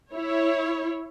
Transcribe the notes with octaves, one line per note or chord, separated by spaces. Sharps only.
E4 C#5